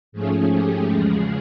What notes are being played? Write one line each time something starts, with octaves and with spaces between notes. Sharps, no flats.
G#2 F3 A3 C#4 G#4
G4
E2 C#3 F3 G#3 G#4